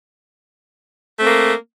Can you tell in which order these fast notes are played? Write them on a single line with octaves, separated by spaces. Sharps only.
A3 C4 A#3